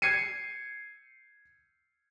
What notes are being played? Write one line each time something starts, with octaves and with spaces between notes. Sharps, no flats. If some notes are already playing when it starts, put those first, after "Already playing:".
G#6 C7 C#7 D#7